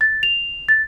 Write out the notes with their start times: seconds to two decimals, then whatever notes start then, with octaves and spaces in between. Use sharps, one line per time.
0.01 A6
0.23 F7
0.69 A6